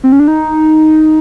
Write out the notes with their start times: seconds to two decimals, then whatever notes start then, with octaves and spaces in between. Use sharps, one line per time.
0.04 C4
0.12 C#4
0.20 D4
0.28 D#4